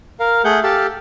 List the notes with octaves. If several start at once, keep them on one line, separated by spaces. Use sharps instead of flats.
A#4 F5
A3 G#4 F#5 G6
G4 A4 F5 A5